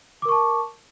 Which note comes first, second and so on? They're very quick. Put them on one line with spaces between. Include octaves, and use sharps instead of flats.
D6 A#4 C#6 A5